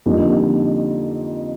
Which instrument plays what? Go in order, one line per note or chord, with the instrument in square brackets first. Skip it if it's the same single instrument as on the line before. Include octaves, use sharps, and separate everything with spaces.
[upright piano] F2 D3 G3 A#3 D#4